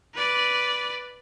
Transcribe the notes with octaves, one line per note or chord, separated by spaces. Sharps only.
B4 D5